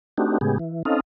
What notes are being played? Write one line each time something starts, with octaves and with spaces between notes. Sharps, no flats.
A3 C4 D4 D#4 F#4 G4
A2 C#3 G#3 B3 G4 G#4
E3
C4 C#4 D#4 A4 D#5 F5